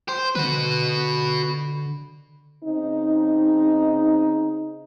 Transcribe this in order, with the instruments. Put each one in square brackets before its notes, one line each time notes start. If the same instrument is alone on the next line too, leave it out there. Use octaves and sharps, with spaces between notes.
[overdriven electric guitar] C5
[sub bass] D3 [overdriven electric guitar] F#4 B4
[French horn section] C#3 C4 D#4